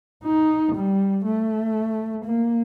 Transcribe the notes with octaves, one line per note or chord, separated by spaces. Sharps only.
D#4
G3
A3
A#3